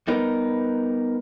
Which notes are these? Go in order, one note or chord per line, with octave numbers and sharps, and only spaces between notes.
G3 B3 D#4 A#4 B4